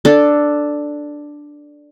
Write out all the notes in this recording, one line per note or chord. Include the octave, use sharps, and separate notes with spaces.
D4 A4